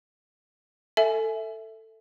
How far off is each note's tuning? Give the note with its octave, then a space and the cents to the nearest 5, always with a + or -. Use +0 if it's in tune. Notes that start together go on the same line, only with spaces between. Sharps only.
A4 +15 E5 -5 G#5 +20